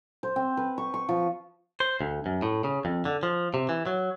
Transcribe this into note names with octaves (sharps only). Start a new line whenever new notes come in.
C5
C4
B4
C#6
C#6
F3
C5
D2
F#2
A2
C#3
F2
D3
F3
C3
E3
F#3